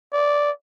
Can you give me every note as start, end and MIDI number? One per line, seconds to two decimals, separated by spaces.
0.13 0.51 74